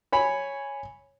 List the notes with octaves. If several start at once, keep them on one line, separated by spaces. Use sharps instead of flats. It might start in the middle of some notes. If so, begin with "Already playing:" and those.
C#5 G#5 B5